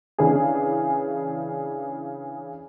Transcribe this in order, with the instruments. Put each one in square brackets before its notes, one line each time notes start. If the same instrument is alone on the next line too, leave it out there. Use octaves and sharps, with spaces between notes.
[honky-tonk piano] C#3 E3 D4 G#4